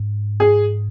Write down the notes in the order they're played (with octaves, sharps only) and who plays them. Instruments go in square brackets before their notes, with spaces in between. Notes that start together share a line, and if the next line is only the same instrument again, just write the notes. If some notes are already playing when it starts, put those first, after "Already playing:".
Already playing: [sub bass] G#2
[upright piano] G#4